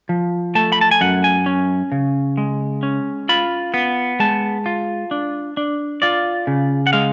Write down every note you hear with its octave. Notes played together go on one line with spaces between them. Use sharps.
F3
A3 A5
B5
A5
G#5
F#2 F#5
G#5
C#4
C#3
G#3
C#4
F4 B5
B3
G#3 A5
F4
D4
D4
F4 D5
C#3
F#5
G#3 F5